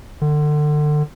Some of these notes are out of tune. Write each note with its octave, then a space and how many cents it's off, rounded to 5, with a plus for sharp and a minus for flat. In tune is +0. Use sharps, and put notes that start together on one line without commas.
D3 +30